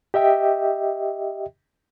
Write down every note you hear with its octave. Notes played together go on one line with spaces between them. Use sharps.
G4 D#5 E5 G5